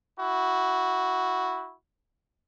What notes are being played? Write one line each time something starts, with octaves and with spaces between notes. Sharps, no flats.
E4 F#4